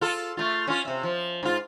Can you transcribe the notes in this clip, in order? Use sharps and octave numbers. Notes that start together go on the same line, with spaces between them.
F4 A4
A3 F4
C#4 F4
C3 E5
F3
G#2 F4